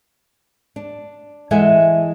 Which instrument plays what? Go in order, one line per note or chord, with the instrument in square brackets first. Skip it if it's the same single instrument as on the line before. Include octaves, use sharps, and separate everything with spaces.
[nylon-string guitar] D4
E3 G#3 A4 E5 F#5 G#5